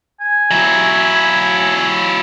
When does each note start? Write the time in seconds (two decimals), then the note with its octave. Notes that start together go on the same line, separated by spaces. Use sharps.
0.21 G#5
0.51 F#3 E4